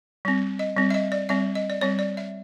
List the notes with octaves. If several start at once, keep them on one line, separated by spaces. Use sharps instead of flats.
G3 C4
D#5
G3 C4
E5
D#5
D5
G3 C4 E5
D#5
D5
G3 C4 C#5
D5
E5